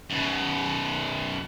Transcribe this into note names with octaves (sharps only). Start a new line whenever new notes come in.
F#2 B2